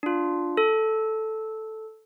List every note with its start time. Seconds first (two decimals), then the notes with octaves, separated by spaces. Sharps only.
0.03 D4 F4
0.57 A4